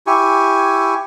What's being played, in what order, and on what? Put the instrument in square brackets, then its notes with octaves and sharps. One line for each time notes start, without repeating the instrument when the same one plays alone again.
[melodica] E4 G4 G#5 C#6